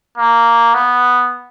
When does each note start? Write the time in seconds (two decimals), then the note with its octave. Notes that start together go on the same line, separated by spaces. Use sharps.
0.18 A#3
0.74 B3